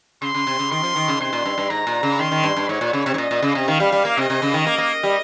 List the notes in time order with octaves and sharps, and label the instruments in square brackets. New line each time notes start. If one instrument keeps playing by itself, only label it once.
[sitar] C#3 [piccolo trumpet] C6
[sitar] C#3
C3
C#3
[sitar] D#3 [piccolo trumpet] C6
[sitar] F3
D#3
C#3
[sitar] C3 [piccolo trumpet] C6
[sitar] A#2
G2
G2
[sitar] G#2 [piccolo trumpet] A#5
[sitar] A#2
C#3
[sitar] D#3 [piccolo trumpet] C6
[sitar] D#3
G2
G2
[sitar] G#2 [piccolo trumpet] C#5
[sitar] A#2
C#3
C3
G#2
[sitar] A#2 [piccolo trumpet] D#5
[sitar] A#2
C#3
C3
[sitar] D#3 [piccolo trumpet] F5
[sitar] G3
G3
A#3
[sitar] C3 [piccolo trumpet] D#5
[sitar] C3
C#3
D#3
A#3
A#3
G3